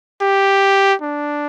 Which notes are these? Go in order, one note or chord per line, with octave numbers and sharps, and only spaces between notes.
G4
D4